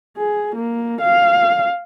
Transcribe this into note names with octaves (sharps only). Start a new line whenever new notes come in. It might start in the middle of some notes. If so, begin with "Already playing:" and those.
G#4
A#3
F5